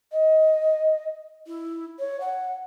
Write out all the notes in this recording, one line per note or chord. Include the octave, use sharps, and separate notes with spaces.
D#5
E4
C#5
F#5